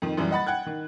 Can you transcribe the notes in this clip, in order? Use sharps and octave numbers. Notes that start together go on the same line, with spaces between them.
F2 D#3
F#2 E3 F#3 G3
D#5 F#5 B5 A6
F#5 G5 F#6 G#6
D#3